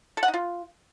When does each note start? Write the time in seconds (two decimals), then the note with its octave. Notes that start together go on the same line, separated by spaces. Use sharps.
0.17 A4
0.23 F#5
0.28 D#4
0.34 F4